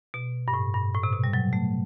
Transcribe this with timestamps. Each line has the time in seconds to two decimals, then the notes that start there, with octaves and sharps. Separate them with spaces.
0.14 B2
0.48 G2
0.54 A2
0.74 G2
0.94 A2
1.03 C3
1.13 B2
1.24 G3
1.33 F#3
1.53 A3